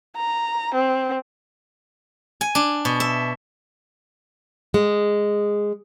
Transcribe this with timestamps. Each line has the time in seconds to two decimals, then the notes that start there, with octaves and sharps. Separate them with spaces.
0.16 A#5
0.74 C4
2.41 G#5
2.55 D4
2.85 B2
3.00 E5
4.74 G#3